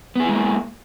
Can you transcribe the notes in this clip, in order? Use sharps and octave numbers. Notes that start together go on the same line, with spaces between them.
G#3 A#3 B3 E4 G#4